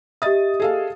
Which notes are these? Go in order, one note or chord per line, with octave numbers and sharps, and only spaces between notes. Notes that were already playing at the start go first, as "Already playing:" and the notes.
G4 D#5 E5 D#6 A6
G#4 A4 F5